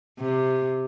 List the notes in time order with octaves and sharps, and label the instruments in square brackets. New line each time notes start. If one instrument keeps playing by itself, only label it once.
[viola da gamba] C3